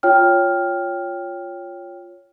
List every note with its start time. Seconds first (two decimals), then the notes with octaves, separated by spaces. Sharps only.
0.03 F4 C#5 G5 F6